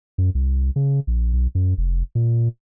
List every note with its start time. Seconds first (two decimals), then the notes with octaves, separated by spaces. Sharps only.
0.18 F#2
0.35 C2
0.76 C#3
1.07 A#1
1.33 B1
1.55 F#2
1.78 F1
2.15 A#2